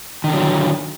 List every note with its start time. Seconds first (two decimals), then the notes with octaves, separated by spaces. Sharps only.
0.24 D#3
0.28 D3
0.33 F#3